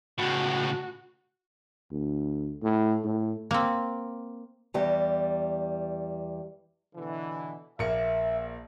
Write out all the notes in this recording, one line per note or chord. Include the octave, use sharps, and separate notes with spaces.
C#2 A2 F#4
D2
A2
A2
A#3 C4
E2 G3
B2 D3 E3
A#1 A#3 E5 C#7